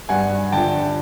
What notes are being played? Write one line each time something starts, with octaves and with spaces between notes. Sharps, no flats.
G2 F#5 G#5
D3 F3 G5 A5